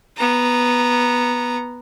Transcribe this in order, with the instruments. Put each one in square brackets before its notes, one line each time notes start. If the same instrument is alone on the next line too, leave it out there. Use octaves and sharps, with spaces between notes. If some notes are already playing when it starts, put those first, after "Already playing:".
[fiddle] B3 A#5